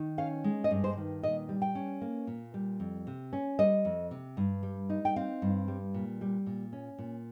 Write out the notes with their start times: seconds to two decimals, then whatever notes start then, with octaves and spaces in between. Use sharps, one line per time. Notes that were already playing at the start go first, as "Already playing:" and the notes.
Already playing: D#3
0.18 C#4 F5
0.44 G#3
0.64 D#5
0.71 G2
0.84 C5
0.97 D#3
1.23 A#2 D#5
1.49 G3
1.62 G5
1.75 C#4
2.02 A#3
2.27 A#2
2.54 G3
2.80 F2
3.07 C3
3.33 C#4
3.59 G3 D#5
3.85 F2
4.11 C3
4.37 G2
4.63 G3
4.90 D#4
5.05 G5
5.16 C4 F5
5.42 G2
5.68 G3
5.94 A#2
6.21 G3
6.46 A#2
6.73 C#4
6.99 A#2